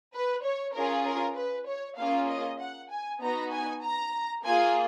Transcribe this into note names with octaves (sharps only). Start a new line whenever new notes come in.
B4
C#5
C#4 F4 G#4 A#4
A#4
B4
C#5
A#3 C#4 F4 G#4 F5
D#5
F#5
G#5
B3 D#4 F#4 A#5
G#5
A#5
A#3 F4 G#4 G#5